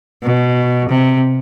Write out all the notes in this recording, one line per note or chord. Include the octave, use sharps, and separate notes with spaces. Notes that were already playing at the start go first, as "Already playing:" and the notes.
B2
C3